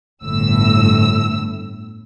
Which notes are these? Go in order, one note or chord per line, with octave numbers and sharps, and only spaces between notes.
G1 A2 E6